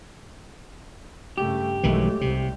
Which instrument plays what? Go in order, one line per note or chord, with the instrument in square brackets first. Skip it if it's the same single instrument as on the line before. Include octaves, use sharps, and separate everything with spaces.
[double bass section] G2 C#3 A3 [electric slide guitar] G4
[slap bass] B1 D#3 E3 [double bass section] F#3 G#3 A3
[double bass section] C2 [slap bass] C3